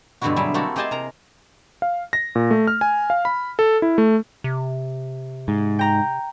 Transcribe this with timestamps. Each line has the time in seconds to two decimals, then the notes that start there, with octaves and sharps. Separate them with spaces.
0.21 G2 B2 D3 C4 E4 F#4
0.36 F#3 G3 G#4 E5
0.54 A3 A#3 C4 E4 F#4 A4
0.76 G4 G#4 C5 D#5 G#5 A5
0.91 C3 A#4 A#5
1.82 F5
2.13 A#6
2.35 A#2
2.51 A3
2.67 F6
2.81 G#5
3.10 F5
3.25 B5
3.59 A4
3.82 E4
3.98 A3
4.44 C3
5.48 G#2
5.79 G5 A#5 G6